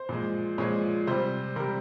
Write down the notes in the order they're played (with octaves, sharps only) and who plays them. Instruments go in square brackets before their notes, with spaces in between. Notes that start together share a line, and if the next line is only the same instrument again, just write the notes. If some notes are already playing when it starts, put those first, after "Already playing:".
Already playing: [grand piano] C5
A#2 F3 G#3
A#2 F3 G#3 C#5
C3 G3 C5
C3 G3 A#4